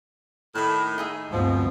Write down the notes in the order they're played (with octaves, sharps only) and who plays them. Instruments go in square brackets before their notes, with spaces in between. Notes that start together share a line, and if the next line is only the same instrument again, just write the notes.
[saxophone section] A2 D#3 [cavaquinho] A5 B5
[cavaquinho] D#4 G#4 E5
[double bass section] D2 G2 C4 [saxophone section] B2 F3